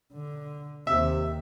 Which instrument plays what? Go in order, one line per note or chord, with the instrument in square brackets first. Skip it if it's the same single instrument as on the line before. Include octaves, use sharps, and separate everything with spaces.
[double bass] D3
[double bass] D#2 [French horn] C3 [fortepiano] E5